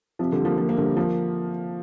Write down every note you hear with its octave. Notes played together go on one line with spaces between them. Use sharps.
C3 F3
D3 G3
F3 A#3
F3 A#3
A#3
D3 G3
F3 A#3